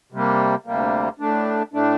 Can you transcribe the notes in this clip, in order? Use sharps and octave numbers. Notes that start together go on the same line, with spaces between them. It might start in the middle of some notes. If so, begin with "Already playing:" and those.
C3 G3 A#3
D2 C3 G3 A#3
A2 A3 D4
A2 A3 D4